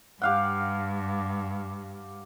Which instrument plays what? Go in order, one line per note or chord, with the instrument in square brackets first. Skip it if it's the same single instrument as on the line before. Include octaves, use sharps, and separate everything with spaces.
[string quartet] G2 [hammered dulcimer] G4 F5 F#5